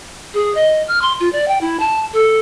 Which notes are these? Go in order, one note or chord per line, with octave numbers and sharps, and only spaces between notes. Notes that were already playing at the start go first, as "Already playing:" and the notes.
G#4
D#5
F6
C6
F4
D5
G5
E4
A5
A4